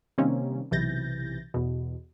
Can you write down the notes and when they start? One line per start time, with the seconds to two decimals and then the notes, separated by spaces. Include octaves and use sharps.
0.18 C3 D#3 G3 A#3 C4 C#4
0.71 B1 C3 E3 G6 A6 A#6
1.54 E2 B2